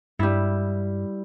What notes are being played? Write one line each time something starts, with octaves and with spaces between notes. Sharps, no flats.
G2 G3 E4